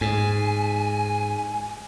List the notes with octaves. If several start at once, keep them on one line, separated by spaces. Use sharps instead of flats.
G#2 G#5